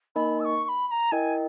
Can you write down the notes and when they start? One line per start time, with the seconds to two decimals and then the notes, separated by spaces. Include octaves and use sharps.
0.15 A#3 D#4 A#4 D#5 G#5 B5
0.40 E6
0.44 C#6
0.64 C#6
0.68 B5
0.87 B5
0.91 A#5
1.11 E4 A#4 D#5 G5 G#5